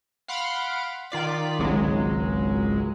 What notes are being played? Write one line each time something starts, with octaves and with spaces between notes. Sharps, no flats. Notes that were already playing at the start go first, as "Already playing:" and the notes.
F5 F#5 B5 C6 F6 D7
D#3 F4 D5 B6
G#1 C#2 F#3 G#3